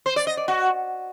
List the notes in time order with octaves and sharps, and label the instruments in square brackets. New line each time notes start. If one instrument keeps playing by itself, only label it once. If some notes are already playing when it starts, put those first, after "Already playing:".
[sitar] C5
D5
D#5
D5
F#4